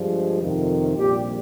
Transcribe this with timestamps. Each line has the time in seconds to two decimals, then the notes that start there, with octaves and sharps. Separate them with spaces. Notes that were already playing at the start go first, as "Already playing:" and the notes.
Already playing: G2 F3 G#3
0.41 F2 C3 D#3
0.96 A#1 A#2 G3 G4